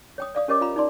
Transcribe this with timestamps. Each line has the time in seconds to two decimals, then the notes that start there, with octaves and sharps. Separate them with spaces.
0.18 C#5 G5 D#6
0.35 D5 F5 D#6
0.48 C#4 G4 A#4 C#5 D#5 D6
0.61 F4 F5 A#5 B5
0.76 D#4 D5 C6